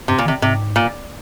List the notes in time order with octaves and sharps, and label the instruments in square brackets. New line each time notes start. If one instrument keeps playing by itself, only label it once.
[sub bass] G2 [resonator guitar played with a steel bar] C3
[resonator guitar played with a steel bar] A#2
[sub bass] D#3
[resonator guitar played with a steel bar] C3
[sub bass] G#2 [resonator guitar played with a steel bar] C3
[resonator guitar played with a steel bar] A#2